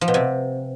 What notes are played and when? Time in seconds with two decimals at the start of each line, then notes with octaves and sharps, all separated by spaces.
0.01 F3
0.08 B2
0.14 C3